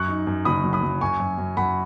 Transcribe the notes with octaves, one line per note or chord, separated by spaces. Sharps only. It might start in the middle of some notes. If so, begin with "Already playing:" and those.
Already playing: F#2 C#6 F#6
D#4
F#2
F#1 B5 D#6
F#3
B5 D#6
F#3
F#2 G#5 C#6
F#2
F#2
F#2 F#5 B5